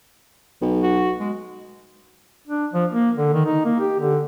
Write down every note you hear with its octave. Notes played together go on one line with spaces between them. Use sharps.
B1
F#4
G#3
D4
F3
A#3
D3
D#3
D#4
A#3
G4
D3